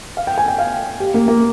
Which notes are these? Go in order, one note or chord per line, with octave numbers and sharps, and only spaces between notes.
F5
G5
G#5
G5
F5
G4
A#3
A#3